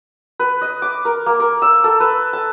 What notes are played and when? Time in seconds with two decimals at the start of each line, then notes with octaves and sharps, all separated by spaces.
0.39 B4
0.61 D#5
0.82 D6
1.05 A#4
1.26 A#3
1.40 A#4
1.62 E6
1.84 A4
2.00 B4
2.33 A5